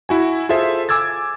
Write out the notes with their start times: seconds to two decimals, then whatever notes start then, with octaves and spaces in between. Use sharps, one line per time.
0.09 E4 F#4 G#5
0.49 F4 G#4 A4 C5 E5
0.89 G#5 D6 E6 G#6 A6